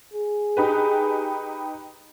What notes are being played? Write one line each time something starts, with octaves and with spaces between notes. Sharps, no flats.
G#4
D#4 G4 B4